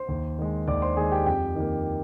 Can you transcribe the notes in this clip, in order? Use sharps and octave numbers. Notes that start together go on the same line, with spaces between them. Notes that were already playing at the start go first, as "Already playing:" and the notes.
Already playing: C5 C6
D#2
D#3 G#3
D#2 D5 D6
C5 C6
D#3 G#3 G#4 G#5
G4 G5
F2 G4 G5
D#3 A#3